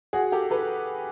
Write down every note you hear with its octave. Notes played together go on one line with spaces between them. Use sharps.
F#4 G#4
G4 A4
A4 B4